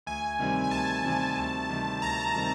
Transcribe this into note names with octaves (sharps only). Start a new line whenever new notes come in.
D2 G#5
C3 D#3 G3 C4
G#5
D2 A5
C3 D#3 G3 C4
D2
C3 D#3 G3 C4
D2 A#5
C3 D#3 G3 C4